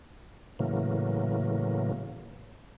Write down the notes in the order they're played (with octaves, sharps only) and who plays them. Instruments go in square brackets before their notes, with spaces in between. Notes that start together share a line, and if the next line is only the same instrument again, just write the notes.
[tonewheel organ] A2 C#3 E3 F#3 A#3